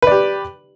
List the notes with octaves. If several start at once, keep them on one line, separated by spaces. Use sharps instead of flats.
G4 B4 D5